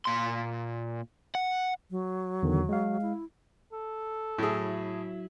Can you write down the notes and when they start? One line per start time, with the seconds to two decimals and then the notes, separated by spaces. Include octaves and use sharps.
0.05 A#2 C6
1.35 F#5
1.91 F#3
2.43 E2 D3 D#3
2.69 G#3 F5
3.02 E4
3.73 A4
4.38 A2 F#3 E4 G#4